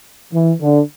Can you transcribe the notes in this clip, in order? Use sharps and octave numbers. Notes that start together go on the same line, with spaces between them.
E3
D3